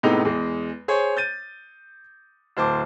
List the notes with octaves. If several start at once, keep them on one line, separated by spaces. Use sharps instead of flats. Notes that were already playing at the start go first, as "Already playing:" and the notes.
A2 C3 G#3 B3 D#4
E2 G#3
G#4 C5 C#5
G6 A6 D#7
D1 C5 A5 D6